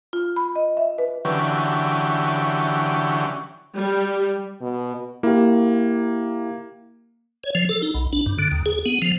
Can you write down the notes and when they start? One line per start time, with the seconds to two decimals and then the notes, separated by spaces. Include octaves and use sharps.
0.13 F4
0.36 B5
0.56 D#5
0.77 E5
0.98 B4
1.25 D3 E3 F#3 C#4 G4
3.75 G3
4.61 B2
5.23 A#3 E4 G4
7.44 C#5
7.55 F3
7.69 A4
7.82 D#4
7.94 B1
8.13 D4
8.26 G2
8.39 D3
8.52 D#2
8.66 G#4
8.86 B3
9.02 F3